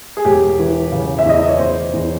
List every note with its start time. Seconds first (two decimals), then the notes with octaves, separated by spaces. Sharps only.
0.17 G#4
0.25 E1 G4
0.59 E3
0.92 C#3
1.19 E5
1.26 E2 D#5
1.39 D5
1.49 C#5
1.59 E2 C5
1.93 E2